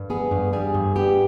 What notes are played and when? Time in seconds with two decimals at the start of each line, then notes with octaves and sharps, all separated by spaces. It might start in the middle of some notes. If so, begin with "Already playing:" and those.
Already playing: G2
0.10 B3 G#4
0.31 G2
0.53 G3 G#4
0.74 G2
0.95 B3 G4